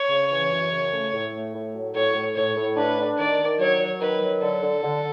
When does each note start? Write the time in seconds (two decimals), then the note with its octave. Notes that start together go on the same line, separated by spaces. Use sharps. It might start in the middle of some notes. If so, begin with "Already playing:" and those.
Already playing: C#5
0.09 C#3
0.30 E3
0.51 F#2
0.71 C#3
0.92 A3
1.13 A2
1.33 A3
1.54 A2
1.74 F#3
1.95 A2 C#5
2.16 A2
2.36 A2 C#5
2.56 A2
2.77 D4 B4
2.98 D4
3.18 D#3 D5
3.39 D#3
3.59 F#3 C#5
3.80 F#3
4.01 D#3 B4
4.22 F#3
4.41 D3 A4
4.62 D3
4.83 D3